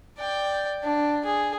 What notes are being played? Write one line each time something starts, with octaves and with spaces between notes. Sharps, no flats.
D5 G5
D4
G#4